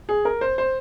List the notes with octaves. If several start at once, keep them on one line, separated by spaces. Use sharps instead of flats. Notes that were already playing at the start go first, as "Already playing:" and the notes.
G#4
A#4
C5
C5